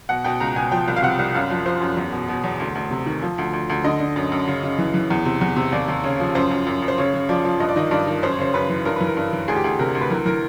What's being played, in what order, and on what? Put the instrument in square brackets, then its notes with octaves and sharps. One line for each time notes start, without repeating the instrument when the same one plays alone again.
[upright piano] B2 F#5
B2 G5
C#2 A#5
B2 G#5
F3 G5
C2
F5
C3 F#5
C2
F#2 F5
F3
F3 C5
F#2
E2
B2
B2
E2
D2
D2
C3
D#3
F3
D2
D2
D2
D3 D#5
D3
F#2
F#2
C#3
C#3
E3
E3
E2
C3
E2
C3
D#2 D5
D#2
C#3 C#5
F3
F#2 C5
F#2
F#2
F#2
C5
C#3 C#5
C#3
F3 D5
F3
G2 D#5
D5
D#3 D#5
G2 D5
D#3
F#2 C5
C#5
C#3 C5
F#2 B4
E3
G2 A#4
E3 B4
A#4
G2
E3
D2 G#4
G4
D2 G#4
C3 A#4
D2
B4
E3 A#4
E3 A#4